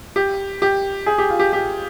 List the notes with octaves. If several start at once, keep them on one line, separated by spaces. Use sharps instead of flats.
G4
G4
G#4
G4
F4
G4
G4